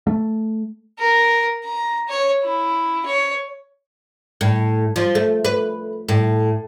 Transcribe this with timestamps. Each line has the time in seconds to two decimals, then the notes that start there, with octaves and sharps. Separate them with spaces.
0.07 A3
0.99 A#4
1.64 A#5
2.08 C#5
2.44 E4
3.06 C#5
4.41 A2
4.96 F3
5.15 A3
5.45 B4
6.09 A2